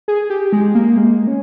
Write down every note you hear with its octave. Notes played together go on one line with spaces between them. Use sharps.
G#4
G4
G#3
A#3
G#3
C#4